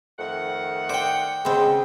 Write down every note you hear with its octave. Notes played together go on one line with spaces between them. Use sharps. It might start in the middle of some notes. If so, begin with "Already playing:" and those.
F2 D#3 A3 F#5
C5 D5 G5
C#3 G#3 B3 C4